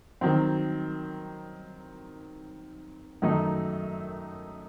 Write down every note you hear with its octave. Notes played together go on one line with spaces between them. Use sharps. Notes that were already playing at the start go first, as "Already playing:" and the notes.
D#3 F#3 C4
F#2 D#3 F#3 A3 D#4